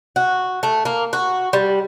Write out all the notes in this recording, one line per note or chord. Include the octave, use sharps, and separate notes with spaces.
F#4
A3
A#3
F#4
G3